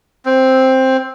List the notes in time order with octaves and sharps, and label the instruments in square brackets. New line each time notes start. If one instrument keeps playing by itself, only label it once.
[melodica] C4